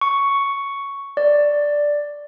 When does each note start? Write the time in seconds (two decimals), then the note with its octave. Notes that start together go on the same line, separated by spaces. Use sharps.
0.01 C#6
1.17 D5